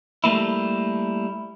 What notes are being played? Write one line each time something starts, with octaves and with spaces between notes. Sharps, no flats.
G3 A3 A#3 E4